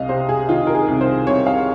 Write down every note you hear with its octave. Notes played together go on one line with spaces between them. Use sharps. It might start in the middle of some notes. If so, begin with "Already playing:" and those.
Already playing: C2 D#5 F5
C3 C5
G#4
D#3 F4
A#4
G#4
C2
C5
C2 C#5
F5